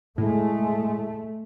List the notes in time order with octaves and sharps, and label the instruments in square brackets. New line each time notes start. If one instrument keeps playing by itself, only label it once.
[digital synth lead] A2 [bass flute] G#3 [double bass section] A3